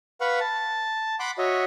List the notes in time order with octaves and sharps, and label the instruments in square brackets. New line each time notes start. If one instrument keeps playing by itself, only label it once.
[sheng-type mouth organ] B4 F5 F#5 C#6
A5
F#5 B5 C6 D6 F#6
F#4 C#5 D#5 E5